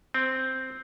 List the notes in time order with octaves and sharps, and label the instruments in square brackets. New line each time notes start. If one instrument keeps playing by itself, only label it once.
[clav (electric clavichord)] C4